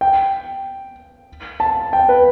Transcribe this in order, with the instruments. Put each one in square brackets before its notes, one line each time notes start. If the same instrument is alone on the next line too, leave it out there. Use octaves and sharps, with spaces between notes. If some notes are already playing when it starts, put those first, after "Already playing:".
[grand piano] G5
A5
G5
B4